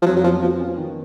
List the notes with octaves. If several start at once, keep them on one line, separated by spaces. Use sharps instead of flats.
F3
F2 F#3
F#3
F3 B3
F3 B3
C#4
D#3